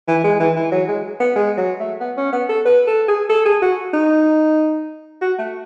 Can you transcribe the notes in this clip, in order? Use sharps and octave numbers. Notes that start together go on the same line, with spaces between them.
E3
G#3
E3
E3
F#3
G#3
B3
G#3
F#3
A3
B3
C#4
B3
A4
B4
A4
G#4
A4
G#4
F#4
D#4
F#4
A3